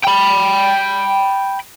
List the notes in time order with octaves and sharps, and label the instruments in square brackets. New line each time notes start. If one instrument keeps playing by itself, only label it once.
[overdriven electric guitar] G5 B5